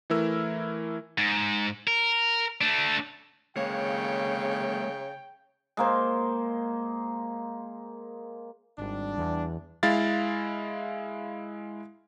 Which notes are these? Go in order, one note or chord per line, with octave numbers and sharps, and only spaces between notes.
E3 A3 E4 A#4 E6
G#2
A#4
A3 D4
C#3 G#3 A#3 C#5 G5
G#3 A#3 C5
G#1 G3 D4
E2
G#3 E4 F5 A6